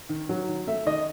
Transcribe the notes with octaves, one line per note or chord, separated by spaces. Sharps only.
D#3
F#3
D#3
A3 E5
D#3 D#5